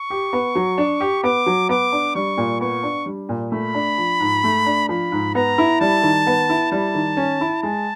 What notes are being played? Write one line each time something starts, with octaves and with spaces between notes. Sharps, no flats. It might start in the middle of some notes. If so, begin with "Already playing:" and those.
Already playing: C#6
G4
B3
F#3
D4
G4
B3 D6
F#3
B3 D6
D4
G3 C#6
A#2
B3 C#6
D4
G3
A#2
A3 B5
D4
F3
G#2
A3
D4
F3 B5
G#2
B3 A#5
E4
G3 A5
D#3
B3
E4
G3 A5
D#3
C#4
E4
G#3 A5